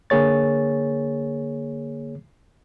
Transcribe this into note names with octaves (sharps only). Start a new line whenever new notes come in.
D3 A#3 G#4 C#5 A6